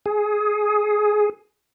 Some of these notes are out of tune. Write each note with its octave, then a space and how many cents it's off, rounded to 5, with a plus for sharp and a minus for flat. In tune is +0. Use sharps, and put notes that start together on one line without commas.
G#4 +15